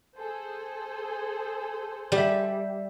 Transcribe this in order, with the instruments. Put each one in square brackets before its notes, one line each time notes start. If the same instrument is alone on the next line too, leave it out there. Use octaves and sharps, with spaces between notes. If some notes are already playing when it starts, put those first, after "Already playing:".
[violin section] G#4 A4 C5
[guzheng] G3 [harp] E5 E7